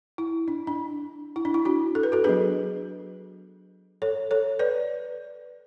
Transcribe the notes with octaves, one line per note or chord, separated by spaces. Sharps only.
E4
D4
D4
E4
D4
E4
D4 F#4
A4
B4
F#4 A4
F#3 B3 D4 G#4 B4
A4 C#5
A4 C#5
B4 D5